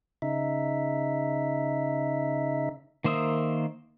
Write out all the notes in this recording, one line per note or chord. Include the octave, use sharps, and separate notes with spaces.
C#3 D#4 E5
D#3 A#3 C5 E5 D#6